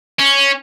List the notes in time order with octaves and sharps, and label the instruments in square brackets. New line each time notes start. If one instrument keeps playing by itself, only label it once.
[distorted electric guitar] C#4